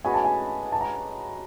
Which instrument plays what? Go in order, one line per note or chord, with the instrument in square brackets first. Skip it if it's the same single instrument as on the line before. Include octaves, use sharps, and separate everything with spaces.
[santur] G#3 C#4 F#4 B4 [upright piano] G#5
[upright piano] A5
G#5
A5
A#5